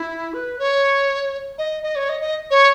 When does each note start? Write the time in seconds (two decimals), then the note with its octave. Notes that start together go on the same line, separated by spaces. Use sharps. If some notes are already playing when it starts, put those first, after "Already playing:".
Already playing: E4
0.33 B4
0.58 C#5
1.58 D#5
1.83 D#5
1.95 C#5
2.09 D#5
2.21 D#5
2.50 C#5